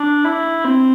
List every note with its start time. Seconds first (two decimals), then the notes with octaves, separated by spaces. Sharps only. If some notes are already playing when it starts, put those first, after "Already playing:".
Already playing: D4
0.25 E4
0.64 C4